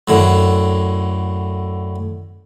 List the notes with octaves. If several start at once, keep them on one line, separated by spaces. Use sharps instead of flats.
F#2 A2 D3